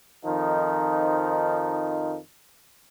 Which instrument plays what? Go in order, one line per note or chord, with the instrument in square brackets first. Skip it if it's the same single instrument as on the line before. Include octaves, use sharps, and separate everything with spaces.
[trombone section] F2 D#3 F3 D#4